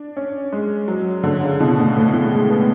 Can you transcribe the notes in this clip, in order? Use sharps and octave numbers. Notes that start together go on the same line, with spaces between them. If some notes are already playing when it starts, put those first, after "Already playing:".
Already playing: D4
C#4
G#3
F#3
D3
C#3
B2
A2
A2
B2
G#3
B3